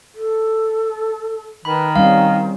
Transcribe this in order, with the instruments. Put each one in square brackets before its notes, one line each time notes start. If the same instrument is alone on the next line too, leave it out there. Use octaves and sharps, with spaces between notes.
[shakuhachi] A4
[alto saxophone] D#3 [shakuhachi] B4 [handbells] B5
[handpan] G3 C4 C#4 [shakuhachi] D#4 [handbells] F5